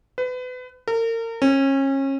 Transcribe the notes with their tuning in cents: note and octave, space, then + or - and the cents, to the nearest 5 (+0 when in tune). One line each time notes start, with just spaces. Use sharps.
B4 +30
A#4 -35
C#4 -30